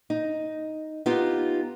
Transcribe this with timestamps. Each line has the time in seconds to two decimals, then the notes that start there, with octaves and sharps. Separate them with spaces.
0.10 D#4
1.06 B3 D#4 F4 G4